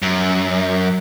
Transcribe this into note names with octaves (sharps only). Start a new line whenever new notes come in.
F#2